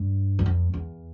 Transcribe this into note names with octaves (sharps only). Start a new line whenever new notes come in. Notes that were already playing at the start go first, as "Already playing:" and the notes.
Already playing: G2
E2
F2
E2